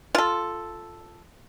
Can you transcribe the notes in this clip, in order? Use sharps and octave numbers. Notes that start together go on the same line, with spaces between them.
F4 A4